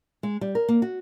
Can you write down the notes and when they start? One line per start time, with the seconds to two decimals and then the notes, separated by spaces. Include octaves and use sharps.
0.23 G#3
0.41 G3
0.55 A#4
0.69 A#3
0.82 F#4